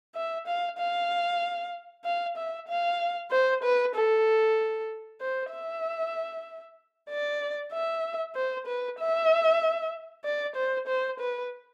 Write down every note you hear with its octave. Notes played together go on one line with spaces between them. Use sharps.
E5
F5
F5
F5
E5
F5
C5
B4
A4
C5
E5
D5
E5
C5
B4
E5
D5
C5
C5
B4